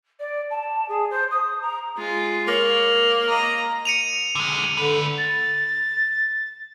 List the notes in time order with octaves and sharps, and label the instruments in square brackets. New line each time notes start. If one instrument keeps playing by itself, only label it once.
[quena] D5
A5
G#4
C5
D#6
A#5
[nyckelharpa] G#3 F4
[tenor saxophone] A#3 [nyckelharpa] C#5
[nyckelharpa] D#5 A#5
[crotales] C#7 D#7 F7
[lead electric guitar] D3 G#3
[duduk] D3 [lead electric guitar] A3 B4
[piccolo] A6